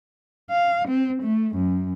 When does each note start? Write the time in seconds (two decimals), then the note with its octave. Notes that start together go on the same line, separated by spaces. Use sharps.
0.50 F5
0.88 C4
1.23 A3
1.55 F#2